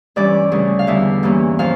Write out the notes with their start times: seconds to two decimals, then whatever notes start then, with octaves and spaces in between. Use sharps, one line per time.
0.16 G2 E3 G3 C#4 D5
0.51 D2 C#3 G3 C#4
0.79 F5
0.87 E2 D3 G3 E5
1.23 G2 E3 A#3 C#4
1.59 A#2 F3 C#4 F5